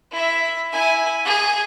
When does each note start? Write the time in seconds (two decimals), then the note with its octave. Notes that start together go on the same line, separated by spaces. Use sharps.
0.11 E4 E5
0.72 E4 G#5
1.25 G#4